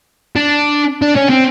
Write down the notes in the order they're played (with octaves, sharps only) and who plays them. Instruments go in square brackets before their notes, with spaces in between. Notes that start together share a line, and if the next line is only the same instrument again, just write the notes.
[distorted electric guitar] D4
D4
C#4
C4